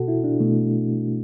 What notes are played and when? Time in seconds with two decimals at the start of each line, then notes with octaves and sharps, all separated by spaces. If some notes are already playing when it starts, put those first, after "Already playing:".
Already playing: B2 F#4 A4
0.08 E4
0.24 D4
0.40 B2 A3